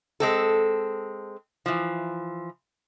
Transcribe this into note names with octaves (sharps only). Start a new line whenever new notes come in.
G#3 C4 A4
E3 F3